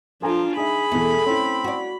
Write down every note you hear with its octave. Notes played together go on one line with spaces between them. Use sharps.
F3 D4 F4 A4 G#5 A#5
D#4 G#4 E5 B5
E2 B2 E3 A3
C4 C#4 E4
F#4 D5